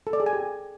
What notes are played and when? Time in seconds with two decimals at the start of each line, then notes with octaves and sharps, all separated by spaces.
0.07 A4
0.13 D5
0.20 G#4
0.26 G#5
0.33 G4